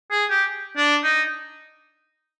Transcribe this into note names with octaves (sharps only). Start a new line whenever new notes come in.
G#4
G4
D4
D#4